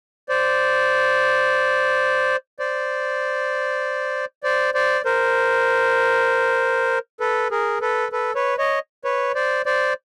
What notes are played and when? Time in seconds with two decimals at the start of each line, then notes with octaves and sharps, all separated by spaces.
0.29 C5 D5
2.59 C5 D5
4.43 C5 D5
4.74 C5 D5
5.05 A#4 C5
7.20 A4 B4
7.51 G#4 A#4
7.81 A4 B4
8.12 A4 B4
8.35 B4 C#5
8.58 C#5 D#5
9.04 B4 C#5
9.35 C5 D5
9.66 C5 D5